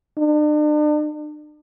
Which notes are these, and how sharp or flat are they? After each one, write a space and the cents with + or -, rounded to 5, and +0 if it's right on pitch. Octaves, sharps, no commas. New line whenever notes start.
D4 +40